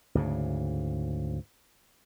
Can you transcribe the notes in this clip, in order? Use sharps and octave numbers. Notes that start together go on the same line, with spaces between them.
D2 G#2 C#3